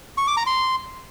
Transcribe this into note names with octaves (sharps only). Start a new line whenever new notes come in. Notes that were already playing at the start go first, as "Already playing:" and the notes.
C#6
D6
A#5
C6